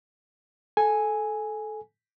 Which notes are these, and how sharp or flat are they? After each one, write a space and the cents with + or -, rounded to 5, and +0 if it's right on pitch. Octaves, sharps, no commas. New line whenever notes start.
A4 -20 G#5 +0